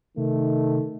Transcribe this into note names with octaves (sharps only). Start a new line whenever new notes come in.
C3 D#3 A3